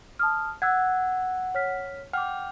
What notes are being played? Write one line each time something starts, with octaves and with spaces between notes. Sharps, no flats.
A5 D#6 F6
F#5 E6 F#6 G#6
C#5 F6 B6
F#5 G5 D6 F6